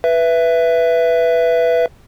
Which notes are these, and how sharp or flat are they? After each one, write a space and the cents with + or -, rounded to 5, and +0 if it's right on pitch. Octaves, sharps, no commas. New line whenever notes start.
B4 +0 E5 +15